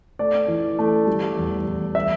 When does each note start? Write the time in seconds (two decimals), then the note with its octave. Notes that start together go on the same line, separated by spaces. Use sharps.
0.19 A3 D5
0.48 E3
0.79 A3
1.07 G3
1.37 E2
1.66 E2
1.95 E5